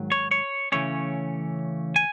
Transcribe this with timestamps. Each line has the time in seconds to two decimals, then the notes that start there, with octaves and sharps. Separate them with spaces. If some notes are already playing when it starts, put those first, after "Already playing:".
Already playing: G#2 D#3 F#3
0.12 C#5
0.31 C#5
0.72 C#3 E3 A3 C#4 C#5
1.96 G#5